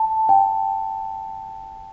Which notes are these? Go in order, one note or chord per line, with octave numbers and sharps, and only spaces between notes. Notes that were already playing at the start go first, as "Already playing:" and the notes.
Already playing: A5
G5